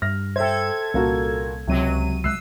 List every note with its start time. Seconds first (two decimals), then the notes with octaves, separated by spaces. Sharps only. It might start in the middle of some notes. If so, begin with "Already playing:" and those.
0.02 G2 F6 A#6
0.36 A4 C5 E5 G5 G#6
0.94 C2 A#2 A#3 C#4 F#4
1.67 C#2 C3 F#3 D#7
2.24 C2 G#3 E6 F#6 C7